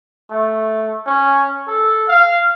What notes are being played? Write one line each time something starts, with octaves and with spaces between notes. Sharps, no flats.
A3
C#4
A4
F5